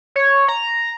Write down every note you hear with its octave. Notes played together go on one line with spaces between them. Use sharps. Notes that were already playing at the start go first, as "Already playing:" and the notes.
C#5
A#5